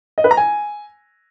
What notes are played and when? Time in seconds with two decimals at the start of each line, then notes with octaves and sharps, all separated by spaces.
0.18 D#5
0.24 B4
0.31 A#5
0.37 G#5